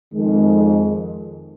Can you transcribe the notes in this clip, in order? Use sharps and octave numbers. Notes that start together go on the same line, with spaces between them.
F2 D#3 G#3